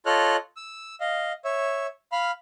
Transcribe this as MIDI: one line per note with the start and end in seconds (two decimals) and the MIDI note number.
0.06 0.36 65
0.06 0.36 69
0.06 0.36 73
0.06 0.36 75
0.06 0.36 89
0.06 0.36 90
0.56 0.95 88
1.00 1.32 75
1.00 1.32 77
1.45 1.87 73
1.45 1.87 76
2.12 2.31 77
2.12 2.31 83
2.12 2.31 89